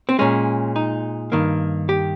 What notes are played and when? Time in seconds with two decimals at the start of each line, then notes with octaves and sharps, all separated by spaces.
0.09 C4
0.19 A#2 G#3 C#4
0.76 D#4
1.32 G2 D#3 A#3
1.89 G4